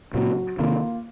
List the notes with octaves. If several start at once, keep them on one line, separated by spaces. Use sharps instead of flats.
A#2 C#3 F#3
C3 D#3 A#3 F4